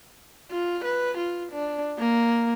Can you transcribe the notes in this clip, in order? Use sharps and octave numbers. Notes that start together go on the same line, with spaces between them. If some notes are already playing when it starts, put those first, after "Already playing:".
F4
B4
F4
D4
A#3